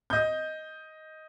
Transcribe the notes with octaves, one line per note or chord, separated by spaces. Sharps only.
D#5 G6